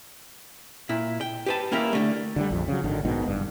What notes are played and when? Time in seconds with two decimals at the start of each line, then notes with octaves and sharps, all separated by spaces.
0.89 A#2 E4
1.21 G5
1.46 G4 B4 A5
1.72 A#3 C#4 E4 G4 A#4
1.93 D3 A3
2.36 D3 E3 G3
2.50 A#1 F2
2.68 C#3 F#3
2.84 G#1 D3 D#3
3.05 A#1 G#2 B2 D#3
3.26 F#1 G2